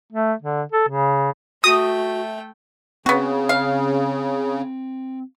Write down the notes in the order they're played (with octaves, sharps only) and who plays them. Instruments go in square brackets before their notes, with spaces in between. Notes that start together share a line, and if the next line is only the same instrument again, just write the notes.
[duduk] A3
D3
A4
C#3
[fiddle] A3 G5 [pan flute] F#4 [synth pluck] D#6
[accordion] C#3 [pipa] B3 F#4 [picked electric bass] C4
[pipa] F5